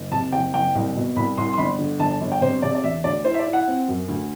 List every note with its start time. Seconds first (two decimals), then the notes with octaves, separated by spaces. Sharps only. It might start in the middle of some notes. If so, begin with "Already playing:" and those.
Already playing: F#1
0.12 C3 A5
0.32 F#1 G5
0.53 F#1 G5
0.75 C2
0.95 B2
1.16 C2 B5
1.37 C2 C6
1.53 C6
1.58 G1 B5
1.79 D3
1.99 G1 A5
2.11 A5
2.21 G1
2.32 G5
2.41 C3 C5
2.62 C3 D5
2.75 D5
2.83 E1 E5
3.04 D2 D5
3.24 E4 C5
3.34 E5
3.39 D5
3.47 E4
3.53 F#5
3.67 C4
3.88 F#2
4.08 D2